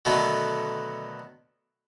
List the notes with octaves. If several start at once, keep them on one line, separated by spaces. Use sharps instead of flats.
B2 D3 D#3 F#3 A3 B3